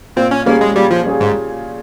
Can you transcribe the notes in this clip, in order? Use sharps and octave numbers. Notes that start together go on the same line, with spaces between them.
A#2 C4
C#4
G3 A#3 C#4 G#4
G#3
A#2 G3
F3
G3 C#4 G#4
G#2